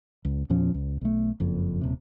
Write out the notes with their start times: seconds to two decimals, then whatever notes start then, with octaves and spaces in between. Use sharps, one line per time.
0.25 C#2
0.50 E2 A#2 F3 C#4
0.74 C#2
1.01 B1 A3
1.40 F#1 F2
1.81 D#1 C3